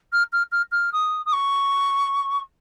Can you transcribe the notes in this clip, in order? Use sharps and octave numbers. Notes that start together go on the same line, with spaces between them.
F6
F6
F6
F6
D#6
D#6
C#6